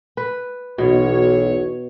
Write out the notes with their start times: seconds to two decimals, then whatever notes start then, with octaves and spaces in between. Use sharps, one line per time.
0.17 B4
0.78 B1 E2 B2 C#5